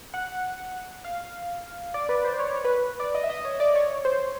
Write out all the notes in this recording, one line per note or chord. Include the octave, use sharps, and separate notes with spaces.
F#5
F5
D5
B4
C5
C#5
C#5
B4
B4
D5
D#5
E5
D#5
C#5
D5
C#5
C5